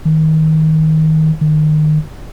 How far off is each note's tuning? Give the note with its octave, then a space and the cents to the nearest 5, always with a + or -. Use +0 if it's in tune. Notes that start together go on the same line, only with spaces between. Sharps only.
D#3 +20
D#3 -25